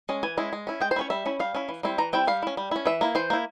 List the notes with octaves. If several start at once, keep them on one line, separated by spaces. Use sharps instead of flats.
G#3 C#4
E3 G#5
G#3 C#4 E4
G#3
C#4 E4
G#3 G5
C5
C#4 E4 C#5
G3 E5
C#4 E4
G3 F5
C#4 E4
E3
G3 C4 E4
E3 A#5
G3 C4 E4 G5
G3 F5
C#4 E4
G3
C#4 E4
E3 E5
A#3 E4
E3 C5
A#3 E4